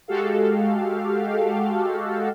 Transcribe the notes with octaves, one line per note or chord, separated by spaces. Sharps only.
G#3 F#4 G4 A4 F5